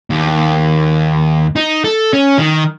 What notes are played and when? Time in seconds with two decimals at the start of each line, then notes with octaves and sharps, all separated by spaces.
0.10 D#2
1.56 D#4
1.84 A4
2.13 C#4
2.38 D#3